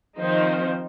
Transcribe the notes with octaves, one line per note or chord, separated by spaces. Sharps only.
D#3 F3 C4 D#4 C5